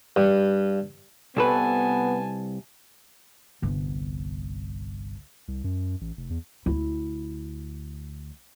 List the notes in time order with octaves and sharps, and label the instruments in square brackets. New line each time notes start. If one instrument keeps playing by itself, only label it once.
[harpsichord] G2
[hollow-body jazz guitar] C2 A4 B4 [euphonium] B3 [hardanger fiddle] G#5 A5
[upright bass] G1 C2
[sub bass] C2
F#2
A1
F1
E2
[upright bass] D2 E4